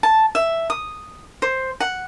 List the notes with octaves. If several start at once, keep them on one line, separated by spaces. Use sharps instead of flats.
A5
E5
D#6
C5
F#5